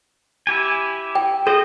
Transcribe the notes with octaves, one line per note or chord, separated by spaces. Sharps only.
E4 G4 G#5
G5
G#4 C5 D#5